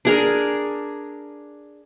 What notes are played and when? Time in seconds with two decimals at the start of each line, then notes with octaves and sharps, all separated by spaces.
0.05 D4 G#4 A#4